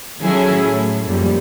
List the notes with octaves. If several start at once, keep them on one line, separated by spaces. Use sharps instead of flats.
D#3 F#3 C#4 E4 G#4 A4
A2
F#2 A#2 F3 G3